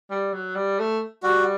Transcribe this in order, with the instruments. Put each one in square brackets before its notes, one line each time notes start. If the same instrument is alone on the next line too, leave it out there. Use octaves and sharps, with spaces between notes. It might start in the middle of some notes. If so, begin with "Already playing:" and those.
[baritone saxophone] G3
F#3
G3
A3
[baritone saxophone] G3 [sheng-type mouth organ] F#4